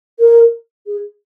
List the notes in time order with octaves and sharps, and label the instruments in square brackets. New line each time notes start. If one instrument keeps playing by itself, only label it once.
[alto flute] A#4
G#4